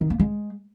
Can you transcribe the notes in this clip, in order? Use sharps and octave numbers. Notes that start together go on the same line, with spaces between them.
D#3
A#3
G#3